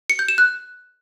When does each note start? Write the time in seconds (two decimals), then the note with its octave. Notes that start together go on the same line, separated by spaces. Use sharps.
0.10 C#7
0.19 G6
0.28 E7
0.38 F#6